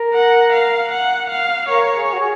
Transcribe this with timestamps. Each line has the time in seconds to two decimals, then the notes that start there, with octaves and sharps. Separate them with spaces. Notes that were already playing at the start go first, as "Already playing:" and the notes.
Already playing: A#4
0.14 F#5
0.52 F5
0.91 F#5
1.30 F5
1.68 A#4 C#5
1.94 G#4
2.13 F#4
2.19 G#4